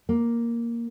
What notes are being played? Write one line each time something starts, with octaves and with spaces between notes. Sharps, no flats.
A#3